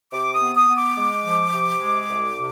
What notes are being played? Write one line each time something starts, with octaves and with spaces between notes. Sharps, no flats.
C3 D6
D#6
B3
D#6
B3
D6
G#3
F3
C3
G#3
C2
C3